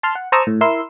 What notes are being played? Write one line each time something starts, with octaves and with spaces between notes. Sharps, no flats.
A5 C6 F6
F#5
C5 A5 A#5 C#6 D#6 E6
A2
E4 A#4 C6 E6